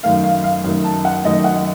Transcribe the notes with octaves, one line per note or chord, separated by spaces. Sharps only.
F#2 D#3 A3 F5
F5
F5
F#2 D#3 A3
A5
F#5
F#2 D#3 A3 D#5
F#5